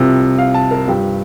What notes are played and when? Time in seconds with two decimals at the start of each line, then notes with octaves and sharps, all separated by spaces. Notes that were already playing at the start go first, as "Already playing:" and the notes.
Already playing: C2 C3 F3
0.38 F5
0.54 A5
0.71 A#4
0.88 G2 F3 G4